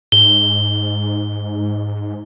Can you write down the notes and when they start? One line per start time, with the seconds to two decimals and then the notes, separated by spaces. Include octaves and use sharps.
0.12 G#2 G7